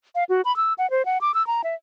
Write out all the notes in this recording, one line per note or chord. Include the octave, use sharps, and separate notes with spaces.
F5
F#4
B5
E6
F#5
C5
F#5
D6
E6
A#5
E5